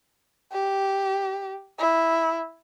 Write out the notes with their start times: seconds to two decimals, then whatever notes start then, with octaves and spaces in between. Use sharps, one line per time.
0.52 G4
1.79 E4